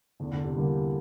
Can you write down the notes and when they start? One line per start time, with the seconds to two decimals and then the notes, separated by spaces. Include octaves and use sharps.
0.20 E2 D3
0.32 D3
0.44 C3
0.56 D3 G3 A#3
0.69 E3